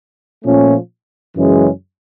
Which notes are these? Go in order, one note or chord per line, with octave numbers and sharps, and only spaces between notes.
A#2 F3 A3 C#4
F#2 C#3 E3 G#3 C#4